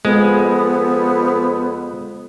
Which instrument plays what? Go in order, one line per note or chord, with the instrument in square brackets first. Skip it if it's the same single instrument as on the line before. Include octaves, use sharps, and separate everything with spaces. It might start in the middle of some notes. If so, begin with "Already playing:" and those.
[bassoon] F2 [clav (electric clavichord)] G#3 [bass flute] B3